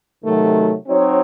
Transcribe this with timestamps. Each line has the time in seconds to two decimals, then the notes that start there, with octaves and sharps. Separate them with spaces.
0.25 C3 D#3 F#3 A3
0.87 F#3 C4 D#4 F#4 C#5